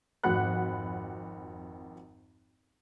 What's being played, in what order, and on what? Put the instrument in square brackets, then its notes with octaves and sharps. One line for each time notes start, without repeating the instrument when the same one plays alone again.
[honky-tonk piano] G#1 F2 F#4 F#5 B5 F#6